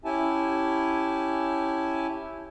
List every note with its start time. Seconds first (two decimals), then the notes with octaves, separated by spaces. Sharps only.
0.05 C#4 E4 G4 E5 G#5 A5